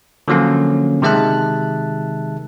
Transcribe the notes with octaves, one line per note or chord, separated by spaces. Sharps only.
D3 F3 F#3 A#3 C#4
C3 D#3 G#3 E5 A5 F#6